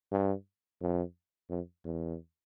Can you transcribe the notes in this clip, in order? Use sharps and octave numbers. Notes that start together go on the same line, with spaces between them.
G2
F2
F2
E2